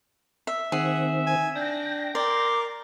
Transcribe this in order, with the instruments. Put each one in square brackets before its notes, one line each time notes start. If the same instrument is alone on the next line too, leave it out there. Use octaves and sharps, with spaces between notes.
[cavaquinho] E5
[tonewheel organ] D#3 C4 [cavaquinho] G#4 [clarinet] E5 [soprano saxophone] F#5
[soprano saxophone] G#5
[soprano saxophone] D4 [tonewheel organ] G5 A#6
[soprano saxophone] A#4 [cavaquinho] D5 [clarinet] C6